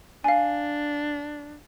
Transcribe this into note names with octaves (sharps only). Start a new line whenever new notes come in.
D4 F5 G#5